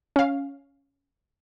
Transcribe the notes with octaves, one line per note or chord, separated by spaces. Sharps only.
C#4 F5